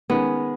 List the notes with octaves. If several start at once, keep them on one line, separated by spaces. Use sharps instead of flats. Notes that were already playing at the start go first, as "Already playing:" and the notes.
D#3 G#3 B3 C#4 G#4